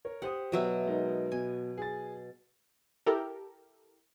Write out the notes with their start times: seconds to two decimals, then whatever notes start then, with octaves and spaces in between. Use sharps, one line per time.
0.05 A#4 C#5
0.22 G4 C5 F#5 D#6
0.52 B2 F#3 E5
0.86 G#3 D#4 A#4
1.32 B2 G#5
1.78 G#4 A6
3.06 E4 G4 A4 A#4